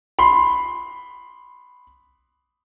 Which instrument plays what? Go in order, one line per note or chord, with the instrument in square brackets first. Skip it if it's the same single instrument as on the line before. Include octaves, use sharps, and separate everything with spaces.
[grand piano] B5 C6